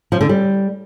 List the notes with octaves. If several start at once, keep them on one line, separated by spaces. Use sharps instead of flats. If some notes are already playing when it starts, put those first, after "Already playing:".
F3
D3
G3